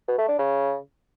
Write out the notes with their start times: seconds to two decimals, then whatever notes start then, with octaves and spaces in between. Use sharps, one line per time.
0.08 B2
0.18 A3
0.28 D4
0.39 C#3